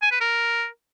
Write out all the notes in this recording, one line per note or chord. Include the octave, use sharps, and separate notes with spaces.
G#5
B4
A#4